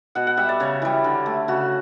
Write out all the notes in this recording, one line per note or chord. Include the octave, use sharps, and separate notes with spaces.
B2 F#5
F#5
G3 E5
D5
C#3 C#5
E3 G3
D3
A3
C#3 F#4